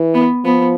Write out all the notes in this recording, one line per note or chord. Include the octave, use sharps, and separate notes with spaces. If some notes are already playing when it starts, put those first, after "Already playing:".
Already playing: E3
B3
F3 B3